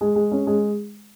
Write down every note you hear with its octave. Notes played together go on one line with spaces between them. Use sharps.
G#3
G#3
C#4
G#3